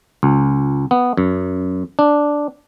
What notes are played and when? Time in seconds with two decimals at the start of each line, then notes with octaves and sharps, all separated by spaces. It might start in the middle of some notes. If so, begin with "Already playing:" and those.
0.23 C#2
0.91 B3
1.17 F#2
1.99 D4